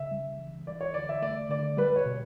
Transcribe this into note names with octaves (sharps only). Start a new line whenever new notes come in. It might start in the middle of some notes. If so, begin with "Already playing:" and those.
Already playing: C#3 E5
G3
E3
G3 D5
C#5
D3 D5
E5
A3 D5
D3 D5
G3 B4
C#5
B2